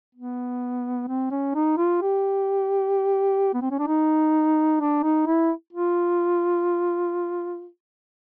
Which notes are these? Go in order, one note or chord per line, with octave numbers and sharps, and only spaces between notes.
B3
C4
C#4
D#4
F4
G4
B3
C4
C#4
D4
D#4
D4
D#4
E4
F4